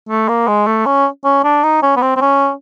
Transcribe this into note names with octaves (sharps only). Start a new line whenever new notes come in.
A3
A#3
G#3
A3
C#4
C#4
D4
D#4
C#4
B3
C4
C4
C#4